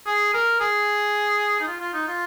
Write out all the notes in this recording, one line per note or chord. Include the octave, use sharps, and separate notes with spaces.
G#4
A#4
G#4
D#4
F4
F4
D#4
F4